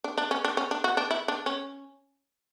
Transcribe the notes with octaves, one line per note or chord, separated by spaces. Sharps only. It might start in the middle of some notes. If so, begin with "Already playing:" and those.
D4
D4
C#4
D4
C#4
D4
F#4
D4
E4
D4
C#4